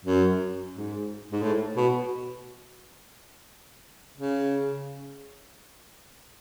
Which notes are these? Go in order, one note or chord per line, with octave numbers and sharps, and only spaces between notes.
F#2
G#2
G#2
A2
B2
C#3